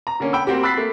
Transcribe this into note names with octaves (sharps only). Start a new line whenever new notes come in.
A#5
D3 A#3 C#4
G5 B5 E6
A#3 C4 F#4 G4
B5 E6 F#6 A6 B6 C7
A3 A#3